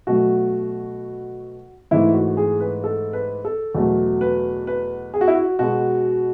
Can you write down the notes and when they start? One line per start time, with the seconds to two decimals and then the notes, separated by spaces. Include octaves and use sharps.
0.07 B2 F#3 A3 F#4
1.91 G#2 E3 A3 E4
2.14 F#4
2.37 G#4
2.60 B4
2.84 A4
3.13 B4
3.45 A4
3.75 E2 B2 F#3 A3
4.21 B4
4.67 B4
5.14 G#4
5.21 F#4
5.28 E4
5.35 F#4
5.59 B2 G#3 F#4